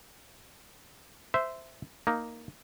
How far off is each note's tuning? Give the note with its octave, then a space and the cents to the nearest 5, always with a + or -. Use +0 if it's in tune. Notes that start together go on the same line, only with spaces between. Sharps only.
C5 -15 E5 +0
A#3 +0 D#4 +0